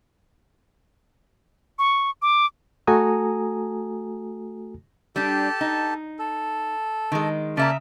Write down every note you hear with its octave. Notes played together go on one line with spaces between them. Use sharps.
C#6
D6
A3 F#4 A4 G#5 A#5 D#6
G3 D4 G4 A4 A5
D#4
A4
D#3 G#3
C#3 A#3 D5 E5 A5 A#5